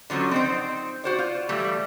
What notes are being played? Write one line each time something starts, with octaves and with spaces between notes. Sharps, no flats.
D3 F3 F#3 C#4
C4 D#4 C5
F#4 C5 D5
F4
E3 G3 A3